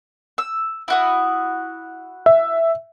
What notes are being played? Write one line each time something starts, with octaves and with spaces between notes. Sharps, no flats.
E6
E4 F#4 D#6
E5